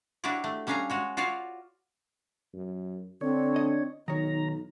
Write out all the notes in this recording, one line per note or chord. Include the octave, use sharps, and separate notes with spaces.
D4 E4 F#4 G4 C#5 D5
A3
G3 C#4 D4 F5 G#5 A#5
G#3 F#4 C#5
F4 F#4 C#5 D5 F5
F#2
D3 C4 D4 C#5
D#5
B1 D#3 D#4 C#5 A#5